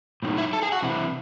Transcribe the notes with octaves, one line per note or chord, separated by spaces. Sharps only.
A2 F#3 C4 D#4
E4 E5
A4 A5
G#4 G#5
F#4 F#5
C3 E3 C4 E4